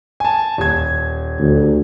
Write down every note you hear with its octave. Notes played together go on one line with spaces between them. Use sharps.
G#5 A5
D#1 G#6
D2